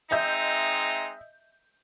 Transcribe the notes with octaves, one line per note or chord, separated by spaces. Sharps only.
G#3 C4 D#4 D#5 E5 G6